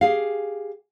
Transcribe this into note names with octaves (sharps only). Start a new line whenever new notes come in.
G4 G#4 F5